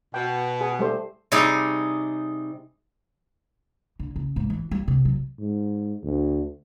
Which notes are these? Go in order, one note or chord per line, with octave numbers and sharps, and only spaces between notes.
B2 G5
G#4
G3 A3 C5
C3 G3 D#4 G#4
D3
C#3
G#2
E3
G3
C3
F#3
G#2
D2